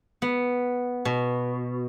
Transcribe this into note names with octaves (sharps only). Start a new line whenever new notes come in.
B3
B2